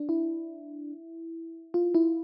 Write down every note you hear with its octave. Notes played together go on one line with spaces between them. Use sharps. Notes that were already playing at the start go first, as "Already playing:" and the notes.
Already playing: D4
E4
F4
E4